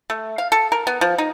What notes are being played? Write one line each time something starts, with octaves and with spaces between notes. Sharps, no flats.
A3
F5
A4
A#4
B3
F3
D#4